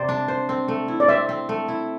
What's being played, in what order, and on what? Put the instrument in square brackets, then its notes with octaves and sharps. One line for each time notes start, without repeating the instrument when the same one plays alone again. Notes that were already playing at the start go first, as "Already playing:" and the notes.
Already playing: [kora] C3 C5 [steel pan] D5
[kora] D4
C5
C4
A3
E4
[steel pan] D5
[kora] C4 [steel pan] E5
[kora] C4
A3
E4